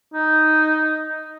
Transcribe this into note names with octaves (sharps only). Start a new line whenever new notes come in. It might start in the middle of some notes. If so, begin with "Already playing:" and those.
D#4